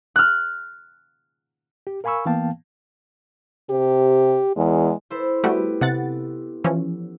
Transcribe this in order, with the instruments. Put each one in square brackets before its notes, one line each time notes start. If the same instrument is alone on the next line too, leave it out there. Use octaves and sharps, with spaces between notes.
[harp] F6 F#6
[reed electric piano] G4
A#4 F5 G#5 B5 C#6 E6
E3 A#3 B3 F5 G5 A5
[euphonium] C3 [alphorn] G4
[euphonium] E2 [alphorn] G#3
[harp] E4 A4 C5
[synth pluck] G3 A3 F#4 [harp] B3 G4
[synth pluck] C3 F#5 A6
E3 F3 C#4